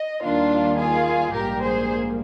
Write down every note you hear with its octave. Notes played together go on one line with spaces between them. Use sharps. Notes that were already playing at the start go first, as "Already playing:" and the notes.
Already playing: D#5
D#2 D#3 G3 A#3 D4 F4
F4 G#4
A#1 G#2 G3 A#3 G4 A#4
G#4 C5